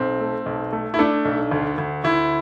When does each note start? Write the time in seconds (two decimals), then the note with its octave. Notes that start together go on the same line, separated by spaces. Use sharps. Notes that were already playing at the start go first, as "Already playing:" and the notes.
Already playing: B1 C4
0.20 A3
0.46 B1
0.73 A3
0.94 E4
0.99 A3 D4
1.25 B1
1.51 D2
1.78 D2
2.04 D2 E4